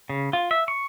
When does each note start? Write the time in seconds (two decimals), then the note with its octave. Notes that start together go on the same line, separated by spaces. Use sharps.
0.09 C#3
0.33 F4
0.51 E5
0.68 C#6